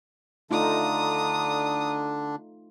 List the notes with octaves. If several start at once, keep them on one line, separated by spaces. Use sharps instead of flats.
D3 A3 D4 D#4 F4 A#5 D#6